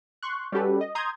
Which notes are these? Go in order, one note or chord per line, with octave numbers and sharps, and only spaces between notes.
C6 C#6 F#6
G3 C#4 F#4 G4 A4 B4
D#5
A#5 C6 D#6 G6 G#6